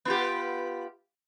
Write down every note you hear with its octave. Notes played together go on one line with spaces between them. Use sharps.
B3 F4 G4